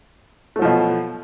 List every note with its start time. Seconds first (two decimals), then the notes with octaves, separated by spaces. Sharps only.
0.56 A3
0.59 F#3
0.62 F3
0.65 B2